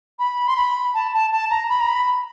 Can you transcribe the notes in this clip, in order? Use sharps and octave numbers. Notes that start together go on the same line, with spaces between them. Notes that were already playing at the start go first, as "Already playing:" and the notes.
B5
C6
B5
A5
A5
A5
A#5
B5
A#5
B5